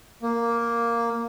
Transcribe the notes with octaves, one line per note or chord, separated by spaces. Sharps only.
A#3